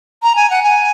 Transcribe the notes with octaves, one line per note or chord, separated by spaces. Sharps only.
A#5
G#5
F#5
G#5